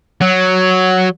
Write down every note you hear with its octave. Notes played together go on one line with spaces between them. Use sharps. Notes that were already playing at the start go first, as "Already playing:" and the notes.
F#3